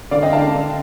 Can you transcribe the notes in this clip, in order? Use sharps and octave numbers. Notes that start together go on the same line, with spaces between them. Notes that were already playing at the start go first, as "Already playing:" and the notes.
D3 D5 F5
D#5 G5
D3 F5 A5
D3